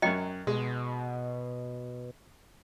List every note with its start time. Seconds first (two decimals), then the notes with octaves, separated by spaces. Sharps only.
0.02 F#2 F#3 D#5 G5
0.47 B2 G#3